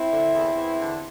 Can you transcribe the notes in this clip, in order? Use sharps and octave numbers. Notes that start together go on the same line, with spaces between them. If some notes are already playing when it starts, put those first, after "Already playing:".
Already playing: C4 E4
D3
E2
E2
D3